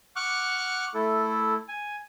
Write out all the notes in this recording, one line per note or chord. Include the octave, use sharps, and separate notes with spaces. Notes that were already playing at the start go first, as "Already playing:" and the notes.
F#5 C#6 D6 F6 F#6
A3 E4 A4
G#5